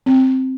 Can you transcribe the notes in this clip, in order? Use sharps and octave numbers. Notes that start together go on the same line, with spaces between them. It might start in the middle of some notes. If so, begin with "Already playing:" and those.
C4